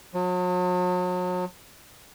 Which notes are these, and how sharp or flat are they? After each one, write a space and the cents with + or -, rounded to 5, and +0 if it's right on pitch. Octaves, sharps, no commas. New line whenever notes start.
F#3 -40